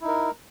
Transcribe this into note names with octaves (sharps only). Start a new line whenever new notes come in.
D#4 E4 A#4